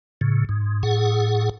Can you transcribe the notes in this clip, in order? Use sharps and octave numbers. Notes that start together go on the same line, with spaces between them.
A2 C#3
G#2
A2 G#4 F#5